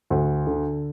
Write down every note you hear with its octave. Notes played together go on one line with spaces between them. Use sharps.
D2
D3